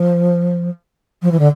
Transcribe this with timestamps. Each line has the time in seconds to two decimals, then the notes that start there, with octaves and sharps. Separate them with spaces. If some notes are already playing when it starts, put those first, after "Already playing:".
Already playing: F3
1.22 F3
1.31 E3
1.39 D3